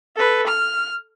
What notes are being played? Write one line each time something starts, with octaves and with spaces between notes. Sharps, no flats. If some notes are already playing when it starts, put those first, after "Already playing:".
A4 B4
F6